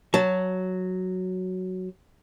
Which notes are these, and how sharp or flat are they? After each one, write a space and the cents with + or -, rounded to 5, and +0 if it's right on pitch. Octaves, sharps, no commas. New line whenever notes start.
F#3 +0 A5 +0